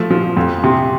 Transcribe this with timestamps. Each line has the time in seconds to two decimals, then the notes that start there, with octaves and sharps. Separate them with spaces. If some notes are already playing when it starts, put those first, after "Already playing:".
Already playing: F3 A3
0.10 F3
0.37 F2
0.64 C3